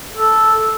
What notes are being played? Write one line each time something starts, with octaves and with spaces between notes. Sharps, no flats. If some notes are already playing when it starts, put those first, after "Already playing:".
A4